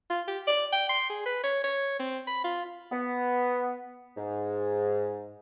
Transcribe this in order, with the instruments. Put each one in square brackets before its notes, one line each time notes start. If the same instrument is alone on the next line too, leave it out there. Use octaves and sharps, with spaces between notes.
[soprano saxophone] F4
G4
D5
G5
C6
G#4
B4
C#5
C#5
C4
B5
F4
[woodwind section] B3
G#2